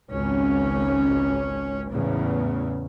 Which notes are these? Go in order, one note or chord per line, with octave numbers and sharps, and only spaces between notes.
G#1 C#2 C#4
E2 A2 C#3